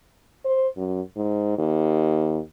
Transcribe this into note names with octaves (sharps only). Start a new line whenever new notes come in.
C5
F#2
G#2
D#2